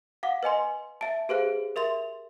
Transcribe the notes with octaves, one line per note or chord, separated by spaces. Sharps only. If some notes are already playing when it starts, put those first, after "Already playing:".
F5 F#5 D6
B4 D#5 G#5 C6
E5 A5
G4 G#4 B4 C5 F5 F#6
A#4 E5 C6 F7